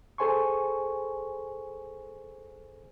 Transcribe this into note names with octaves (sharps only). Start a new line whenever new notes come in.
G#4 A4 C5 G#5 C6 C#6